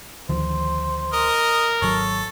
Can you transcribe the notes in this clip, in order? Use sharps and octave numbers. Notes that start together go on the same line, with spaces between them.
D2 D#3 F3 C5
A#4 D#5
G#1 F#3 A4 C#5